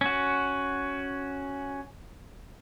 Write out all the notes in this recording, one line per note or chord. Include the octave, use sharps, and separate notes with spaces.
C#4 F#4